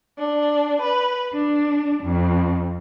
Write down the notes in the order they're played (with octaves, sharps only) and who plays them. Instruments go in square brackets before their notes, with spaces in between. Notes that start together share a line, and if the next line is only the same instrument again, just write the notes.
[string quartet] D4
B4
D4
F2